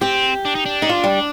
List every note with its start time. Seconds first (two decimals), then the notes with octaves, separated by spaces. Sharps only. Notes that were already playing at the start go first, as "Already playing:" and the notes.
0.01 C4 G4
0.45 D4
0.55 D#4
0.66 D4
0.82 D#4
0.89 F4
1.04 G3